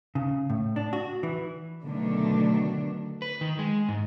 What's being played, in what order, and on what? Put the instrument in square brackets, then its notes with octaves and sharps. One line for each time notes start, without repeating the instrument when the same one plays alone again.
[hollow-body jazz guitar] C#3
A2
D4
F#4
E3
[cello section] B2 D3 D#3 F#3 A3 D4
[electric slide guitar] B4
D#3
G#3
G#2